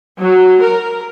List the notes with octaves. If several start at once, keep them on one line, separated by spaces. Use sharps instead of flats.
F#3
A#4